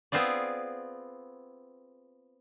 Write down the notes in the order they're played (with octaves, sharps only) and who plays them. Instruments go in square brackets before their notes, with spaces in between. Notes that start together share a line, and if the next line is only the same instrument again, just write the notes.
[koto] B3 C4 F4 G#4 D5